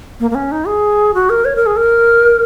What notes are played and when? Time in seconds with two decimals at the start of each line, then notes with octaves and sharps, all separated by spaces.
0.20 A#3
0.31 A#3
0.35 C#4
0.52 D#4
0.67 G#4
1.14 F#4
1.30 A#4
1.45 C#5
1.56 A#4
1.66 G#4
1.77 A#4